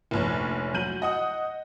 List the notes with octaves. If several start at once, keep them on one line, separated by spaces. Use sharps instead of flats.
F1 A#1 C#5
F#3 G6 D#7 F#7
D#5 F#5 D#6